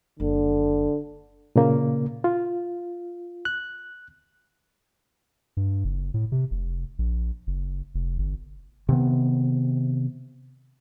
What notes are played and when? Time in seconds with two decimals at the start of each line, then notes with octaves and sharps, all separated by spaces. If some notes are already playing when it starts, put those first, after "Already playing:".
0.20 F#1 D3
1.56 A#2 C#3 A#3
2.24 F4
3.45 F#6
5.57 G2
5.84 F#1
6.14 A2
6.32 C3
6.51 F1
6.99 A#1
7.47 F#1
7.94 F1
8.18 G1
8.89 C3 D#3 B3